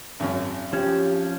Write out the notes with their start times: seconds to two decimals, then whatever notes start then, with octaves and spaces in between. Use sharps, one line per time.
0.20 G#1 F#2
0.73 F3 C#4 G4